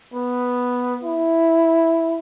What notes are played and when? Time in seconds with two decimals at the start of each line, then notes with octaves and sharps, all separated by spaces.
0.14 B3
1.03 E4